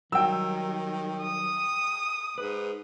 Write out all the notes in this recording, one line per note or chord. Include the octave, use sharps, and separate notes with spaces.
D#3 F#3 G3 G5 E6
D#6
G#2 B4